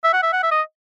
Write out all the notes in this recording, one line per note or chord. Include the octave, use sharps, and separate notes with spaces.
E5
F#5
E5
F#5
E5
D#5